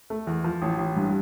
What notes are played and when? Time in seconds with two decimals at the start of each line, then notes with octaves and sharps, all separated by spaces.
0.10 A3
0.27 E2
0.44 F3
0.62 A1
0.79 A1
0.96 G2